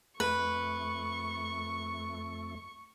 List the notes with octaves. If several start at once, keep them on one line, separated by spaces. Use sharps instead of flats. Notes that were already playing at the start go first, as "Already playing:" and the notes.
F2 A3 B4 C#6